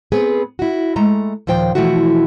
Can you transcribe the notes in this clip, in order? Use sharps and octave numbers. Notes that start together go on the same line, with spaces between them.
B3 C4 G#4 B4
E4 F#4
G#3 A3 A#5
D#2 A#2 F3 C5 G5
B2 E3 F3 A3 E4 F#4